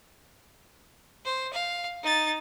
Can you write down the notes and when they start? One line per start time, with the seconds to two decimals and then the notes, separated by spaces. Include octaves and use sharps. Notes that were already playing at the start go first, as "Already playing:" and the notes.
1.25 C5
1.53 F5
2.03 D#4 A6